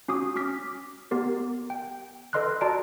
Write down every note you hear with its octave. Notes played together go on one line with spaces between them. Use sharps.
C#4 F#4 D6 D#6
C#4 D6 F6 B6
B3 G4 A#4
G5
A4 B4 D#5 C6 F6 F#6
F#4 D5 D#5 A5 A#5 D7